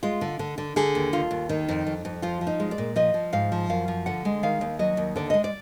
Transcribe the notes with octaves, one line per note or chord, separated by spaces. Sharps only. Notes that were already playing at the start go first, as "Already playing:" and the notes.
G#3 F4
D3
D3
D3
D3 G#4
D#2
D#2 F4
D#2
D#3 D#4
F2
F2
F2
F3 F4
F3
D#4
G#3
D5
A#2
F3 D#5
F3
G#2 F5
F3
F#2 F5
F3
D3 F#5
G#3
D#3 F5
D#2
F#3 D#5
D#2
D3 D5
G#3 D#5
D5